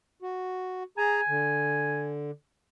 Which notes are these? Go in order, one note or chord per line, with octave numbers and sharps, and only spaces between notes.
F#4
G#4 G#5 A#5
D3